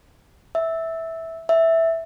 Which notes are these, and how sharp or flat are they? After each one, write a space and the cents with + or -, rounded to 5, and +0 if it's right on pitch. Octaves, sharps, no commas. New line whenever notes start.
E5 -10
E5 -5